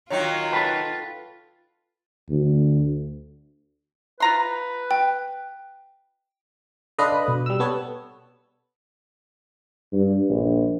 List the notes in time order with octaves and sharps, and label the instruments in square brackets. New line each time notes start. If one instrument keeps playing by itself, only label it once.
[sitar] D#3 F#3 D#4 [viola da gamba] F4 [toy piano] C#5 G5
[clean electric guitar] A4 B4 [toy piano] G5 A5
[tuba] D2
[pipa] F4 A#5 C6 [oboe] B4
[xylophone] G5
[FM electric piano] D4 B4 D#5 [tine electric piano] A4 F5 C6
[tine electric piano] B5
B2
[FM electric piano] G3 E6
B3 A4 C#5
[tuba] G2
A#1